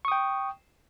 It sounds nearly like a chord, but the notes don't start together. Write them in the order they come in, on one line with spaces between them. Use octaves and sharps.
C#6 D#6 G5